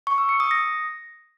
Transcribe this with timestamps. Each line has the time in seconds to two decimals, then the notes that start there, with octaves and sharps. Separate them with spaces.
0.07 C#6
0.18 E6
0.29 C#7
0.40 D#6
0.51 A#6